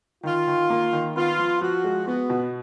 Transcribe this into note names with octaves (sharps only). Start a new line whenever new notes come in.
D#3 F4
D#3
A#3
D#3
B3 F4
F3
F3 F#4
G#3
B3 F#4
B2